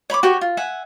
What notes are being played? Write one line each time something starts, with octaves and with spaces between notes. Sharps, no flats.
C#5 B5 C6 D6
F#4 G4 C#5 G5
F4
E5 F#5 G#5